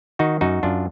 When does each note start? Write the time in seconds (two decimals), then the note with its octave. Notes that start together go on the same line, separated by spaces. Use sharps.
0.19 D#3 D#4 F#4
0.41 F#2 D#4 F#4
0.63 F#2 D4 F4